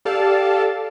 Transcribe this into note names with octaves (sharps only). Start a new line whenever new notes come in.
G4 A4 D5 F5 A5